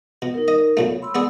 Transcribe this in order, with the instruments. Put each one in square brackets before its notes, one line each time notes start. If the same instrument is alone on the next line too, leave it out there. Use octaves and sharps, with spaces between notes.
[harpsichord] B2
[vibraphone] D#4 A#4
[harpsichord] D#5
[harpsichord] B1 A#2 A3 [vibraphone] C#5
[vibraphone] B5 C6 E6
[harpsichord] B3 G#4 D5